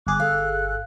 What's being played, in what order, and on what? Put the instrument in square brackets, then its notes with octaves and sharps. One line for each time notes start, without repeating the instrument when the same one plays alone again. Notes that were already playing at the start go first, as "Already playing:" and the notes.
[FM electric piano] G1 G#4 [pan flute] D6 [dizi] F#6
[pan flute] A4 [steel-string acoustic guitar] F5